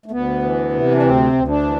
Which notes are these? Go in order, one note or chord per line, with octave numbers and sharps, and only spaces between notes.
A3
D2 B3
E3
C3
D4
D2 C4
D2
D4
E3